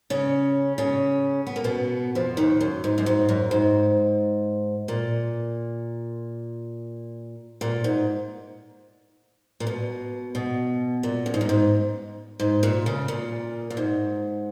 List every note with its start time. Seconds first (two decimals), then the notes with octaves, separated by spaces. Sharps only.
0.10 C#3 C#4
0.78 C#3 C#4
1.47 B3
1.56 A#3
1.64 B2 B3
2.15 F2 F3
2.37 D#2 D#3
2.61 F#2
2.84 G#2
2.98 F#2
3.06 G#2
3.29 F#2
3.51 G#2
4.88 A#2
7.61 A#2
7.84 G#2
9.60 A#2
9.67 B2
10.35 B2
11.03 A#2
11.26 F#2
11.34 G#2
11.41 F#2
11.49 G#2
12.40 G#2
12.63 A#2
12.86 C#3
13.08 A#2
13.70 A#2
13.77 G#2